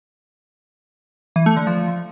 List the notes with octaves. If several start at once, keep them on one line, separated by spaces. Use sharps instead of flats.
E3
A3
D3
F3